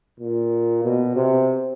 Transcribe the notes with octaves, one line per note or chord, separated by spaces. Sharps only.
A#2
B2
C3